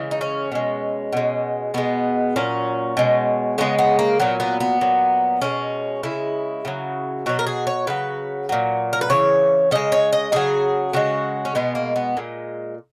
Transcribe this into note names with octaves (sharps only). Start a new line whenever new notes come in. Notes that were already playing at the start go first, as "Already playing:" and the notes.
Already playing: C#3 E3 G#3
D#4
C#4
B2 G#3
B2 G#3
B2 G#3 B3
A#2 F#3 C#4
B2 G#3
C#3 G#3 B3
B3
A#3
A#2 F#3 B3
B3
B3
A#2 F#3
B2 G#3 C#4
C#3 G#3 E4
C#3 F#3
B2 F#3 F#4
A#4
G#4
C#5
C#3 F#3 B4
A#2 F#3
A#4
B4
C#3 E3 C#5
C#3 G#3 D#5
C#5
D#5
C#3 F#3 G#4
C#3 G#3 F#4
C#4
B2 G#3 B3
A#3
B3
A#2 G#3